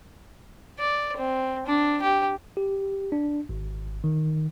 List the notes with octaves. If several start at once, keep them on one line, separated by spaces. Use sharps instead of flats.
D5
C4
D4
G4
G4
D4
G#1
D#3